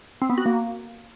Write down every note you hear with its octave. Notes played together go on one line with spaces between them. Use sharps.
C4
B3
F#4
A#3